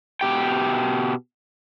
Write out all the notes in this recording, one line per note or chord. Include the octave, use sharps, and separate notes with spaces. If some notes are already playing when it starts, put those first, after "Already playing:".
B2 G4 G5